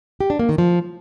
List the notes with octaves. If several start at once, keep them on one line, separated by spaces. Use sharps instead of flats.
G4
D4
A#3
D#3
F3